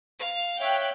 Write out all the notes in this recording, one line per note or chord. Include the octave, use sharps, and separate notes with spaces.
F5
C#5 E5 G5 F#6